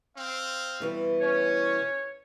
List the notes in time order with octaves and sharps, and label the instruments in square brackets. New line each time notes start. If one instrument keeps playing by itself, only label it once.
[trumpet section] C4 F5
[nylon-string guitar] B2 E3 G3
[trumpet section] C#4 [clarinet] C#5